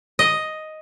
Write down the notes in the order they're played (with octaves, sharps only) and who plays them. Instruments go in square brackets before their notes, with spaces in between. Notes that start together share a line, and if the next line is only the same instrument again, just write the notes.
[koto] D#5